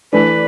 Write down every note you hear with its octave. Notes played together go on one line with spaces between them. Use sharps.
E3 A3 D4 B4